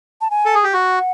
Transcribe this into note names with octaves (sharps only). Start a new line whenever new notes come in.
A5
G#5
A4
G#4
G4
F#4 F#5